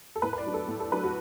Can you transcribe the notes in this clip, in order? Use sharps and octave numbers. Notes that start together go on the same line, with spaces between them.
A4
A2 B4
B4
D5
F#3 D4
A4
A2
A4
F#3 D4 B4
F#4